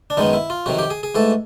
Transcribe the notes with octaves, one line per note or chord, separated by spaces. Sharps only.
D4
F#2 D#3 G#3 B3 D#4
E4
F4
F2 C3 D#3 F#3 F#4
G4
G#4
G#4
G#2 E3 A3 A4